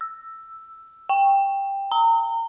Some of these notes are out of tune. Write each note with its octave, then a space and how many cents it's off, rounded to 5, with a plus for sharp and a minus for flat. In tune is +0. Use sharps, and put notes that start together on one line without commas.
E6 +5
G5 +10
A#5 -30